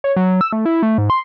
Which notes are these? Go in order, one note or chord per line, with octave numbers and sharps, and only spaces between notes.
C#5
F#3
E6
A3
E4
A3
G#2
C6